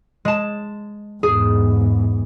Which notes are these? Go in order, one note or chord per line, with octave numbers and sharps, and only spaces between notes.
G#3 A5
E2 G#2 G#4